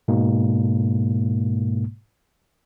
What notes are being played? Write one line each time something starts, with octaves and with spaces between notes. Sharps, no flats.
G#2 B2 G#3 A#3